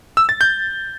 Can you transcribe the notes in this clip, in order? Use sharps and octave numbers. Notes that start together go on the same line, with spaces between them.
E6
A6
G6